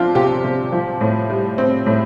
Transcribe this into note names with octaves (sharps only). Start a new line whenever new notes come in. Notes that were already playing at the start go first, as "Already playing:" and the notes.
Already playing: F3 C4 D4 F4
C3 G4
C3
F3
A2
G3
C4
A2